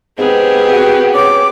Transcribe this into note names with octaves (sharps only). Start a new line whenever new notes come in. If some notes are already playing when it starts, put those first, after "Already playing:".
G#2 B3 C4 G4 G#4
F#4
C#4 D6